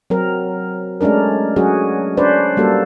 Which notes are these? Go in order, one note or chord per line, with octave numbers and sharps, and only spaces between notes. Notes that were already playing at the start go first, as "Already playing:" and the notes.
F#3 C4 A#4
G#3 A3 C#4 D4 A#4
F#3 C#4 F#4 G#4
C#4 D4 B4 C5 D5
G3 A#3 F#4 A4